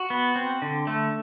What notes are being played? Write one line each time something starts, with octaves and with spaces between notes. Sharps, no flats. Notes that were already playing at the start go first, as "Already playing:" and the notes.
Already playing: F#4
B3
C4
D3
A3